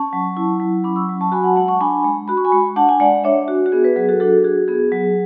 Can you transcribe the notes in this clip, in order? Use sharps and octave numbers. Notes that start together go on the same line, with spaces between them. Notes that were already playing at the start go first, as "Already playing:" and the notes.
Already playing: C#4 A5 C#6
F#3
E4
F#3
C#4 B5 D6
C#6 E6
F#3
A5 C#6
F#4 G#5 B5
F#5 A5
G#3 F#5 A5
A5 C#6
D4 G#5 B5
G#3
F#4 B5
C#6
G#5 B5
G#3
D4 F#5 A5
G#5
G#3 D5 F#5
D4 C#5 E5
F#4
F#4
B3 G#4
G#4 B4
F#3 G#4
F#4 A4
D4 F#4 A4
F#4 G#4
B3 G#4
F#3